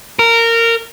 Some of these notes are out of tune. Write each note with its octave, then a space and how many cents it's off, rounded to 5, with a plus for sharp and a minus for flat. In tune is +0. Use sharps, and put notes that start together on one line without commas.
A#4 -15